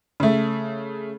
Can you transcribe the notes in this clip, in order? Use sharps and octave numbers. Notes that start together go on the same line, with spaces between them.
C#3 A3